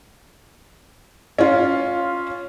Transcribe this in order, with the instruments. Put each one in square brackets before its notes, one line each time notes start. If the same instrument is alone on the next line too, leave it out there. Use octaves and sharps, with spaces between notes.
[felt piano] C#4 F4